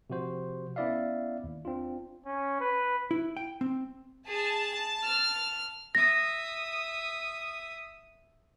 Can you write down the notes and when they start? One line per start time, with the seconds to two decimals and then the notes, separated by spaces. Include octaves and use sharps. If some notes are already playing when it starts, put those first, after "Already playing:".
0.10 C3 F3 F#4 C5
0.76 B3 C#4 E4 D5 E5 F5
1.44 D#2
1.65 C4 D4 F4
2.26 C#4
2.61 B4
3.11 E4
3.37 G5
3.61 C4
4.28 G#4 A5
5.05 F6
5.95 E5 D#6 A#6